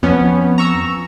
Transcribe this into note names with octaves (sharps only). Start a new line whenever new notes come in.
F2 B3 C#4
A#5 C#6 E6